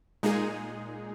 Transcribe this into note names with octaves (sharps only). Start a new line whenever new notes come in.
A#2 G#3 D#4 G#4